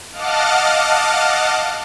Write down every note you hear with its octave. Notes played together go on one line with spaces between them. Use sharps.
D#5 F5 F#5 A5 D6 F6